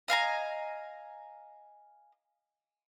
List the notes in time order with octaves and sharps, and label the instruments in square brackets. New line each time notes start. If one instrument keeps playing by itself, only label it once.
[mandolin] D#5 F5 G#5 A#5